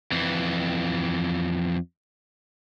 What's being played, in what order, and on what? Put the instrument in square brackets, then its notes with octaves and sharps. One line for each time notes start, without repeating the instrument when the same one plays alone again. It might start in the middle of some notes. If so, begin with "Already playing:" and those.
[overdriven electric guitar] F2 E3